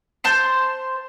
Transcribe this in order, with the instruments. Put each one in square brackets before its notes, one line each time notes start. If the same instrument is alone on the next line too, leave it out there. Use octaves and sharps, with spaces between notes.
[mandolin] C5 A5 C6